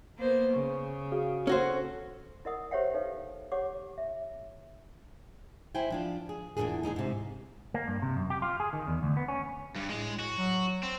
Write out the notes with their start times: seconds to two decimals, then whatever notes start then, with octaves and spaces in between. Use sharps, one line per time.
0.18 A#3 B3 C5
0.54 C#3 C#6
1.12 F#4 G#4 F5
1.47 C#4 F#4 A4 C5
2.45 E4 A#4 D#5 F#5 D#6
2.71 G4 C5 C#5 E5 F#5 G5
2.94 D#4 A4 B4 C#5 F5
3.52 G4 C#5 F#5 D6
3.98 E5
5.75 E4 C5 G5 G#5
5.90 F3 D4 F4
6.29 G#4
6.57 E2 A#2 D#3 E3 D4 G#4
6.83 G#3 D#4 E4 G#4
6.96 G#2 C3
7.74 A#3
7.88 G2
8.02 C3
8.16 F#2
8.30 G4
8.42 F4
8.60 G#4
8.73 D#3
8.87 E2
9.03 D2
9.17 B3
9.28 C#4
9.76 G2
9.90 A2 G#3
10.20 F#4
10.37 F#3
10.83 C4